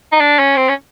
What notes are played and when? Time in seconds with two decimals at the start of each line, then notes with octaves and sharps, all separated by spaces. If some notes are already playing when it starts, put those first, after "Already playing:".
0.12 D#4
0.20 D4
0.39 C#4
0.57 C4
0.69 C#4